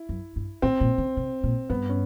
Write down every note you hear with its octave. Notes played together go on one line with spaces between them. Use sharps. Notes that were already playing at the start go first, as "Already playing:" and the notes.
Already playing: E4
F#2
G2
A2 C4
A#2
C#3
C3
A#2
G2 B3
C#4